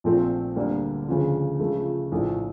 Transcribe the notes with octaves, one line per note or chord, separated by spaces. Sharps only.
A#1 A#2 F3 A3 C4
D2 D3 G3 A#3
D2 C#3 F3
C#2 C#3 F3 A3
A#1 A2 E3 A3